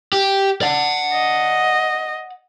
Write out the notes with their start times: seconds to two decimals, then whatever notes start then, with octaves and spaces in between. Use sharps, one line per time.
0.13 G4
0.62 D5 F#5
1.13 D#5